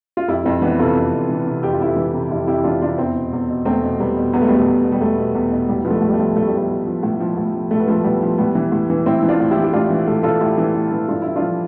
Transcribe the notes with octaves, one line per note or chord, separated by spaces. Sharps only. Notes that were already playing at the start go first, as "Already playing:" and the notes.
F4
F2 E4 G4
F2 C4 E4
E3 B3 D4
C3 F4 A4
F2
F2
E3
C3
F2 G4
F4
F2 E4 G4
E3
C3
F2 E4 G4
F2 E4 G4
E3 D4 F4
C3 D4 F4
E2 C4 E4
B2
E2
B2
E2 A3 C4
B2
E2 G3 B3
B2
E2 B3
A3
B2 G3
A3
E2
B2
G3
E2 A3
B2
E2
B2
A2 G3
F3 B3
A3
A2
G3
A3
F3
A2 A3
G3
F3 A3
A2
F3
A2
F3
A2
F3
A2 A3
B3
F3 A3
A2 G3 B3
F3
A2 G3 B3
E3
A2
E3
A2 C4 E4
E3
D4 F4
A2
E4 G4
E3
G4
A2 D4 F4
E3
A2 A4
E3 F4 A4
A2 E4 G4
E3
A2
E3
G2 F4
G2 E4
D4 F4
F3